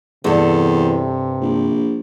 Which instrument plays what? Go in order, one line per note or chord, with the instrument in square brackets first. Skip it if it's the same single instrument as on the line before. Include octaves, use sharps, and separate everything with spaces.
[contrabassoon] E2 [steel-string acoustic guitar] G2 A4 [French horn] C3
[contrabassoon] A#1